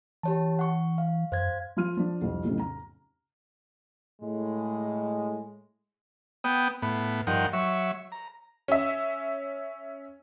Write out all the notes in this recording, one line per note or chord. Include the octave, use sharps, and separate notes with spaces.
E3 G4 C#5 A5
F#5 C#6
F5
F#2 C5 F5 G#6
F3 F4 F6 D#7
F3 D4
C2 F2
B1 F2 A2 C#3
A#5
A2 G#3
B3 G5 D#6
A2 B3
G2 F3 D#4 A#4 F#5 G5
F#3 E5 C#6
A#5
C#4 E5